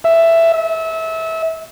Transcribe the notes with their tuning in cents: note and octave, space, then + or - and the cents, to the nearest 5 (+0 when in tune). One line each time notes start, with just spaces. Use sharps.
E5 +10
E5 -25